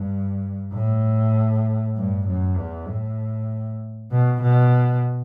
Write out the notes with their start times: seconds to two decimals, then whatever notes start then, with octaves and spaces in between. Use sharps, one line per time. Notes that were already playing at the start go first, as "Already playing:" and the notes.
Already playing: G2
0.72 A2
1.95 G2
2.27 F#2
2.57 E2
2.87 A2
4.11 B2
4.41 B2